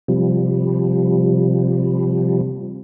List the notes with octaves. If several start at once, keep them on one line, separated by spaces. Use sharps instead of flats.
C3 F3 G3